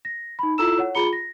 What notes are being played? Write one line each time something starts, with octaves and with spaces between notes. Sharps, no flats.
A#6
D#4 B5
E4 F4 A4 A#5 E6 E7
C#5 F#5
F4 G#4 A#5 B5 C#7 G7
A#6